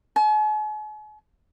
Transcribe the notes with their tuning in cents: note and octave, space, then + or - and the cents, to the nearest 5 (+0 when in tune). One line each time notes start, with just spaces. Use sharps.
G#5 +45